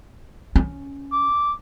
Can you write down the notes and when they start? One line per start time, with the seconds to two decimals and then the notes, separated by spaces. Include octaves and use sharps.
0.56 C#4
1.12 D6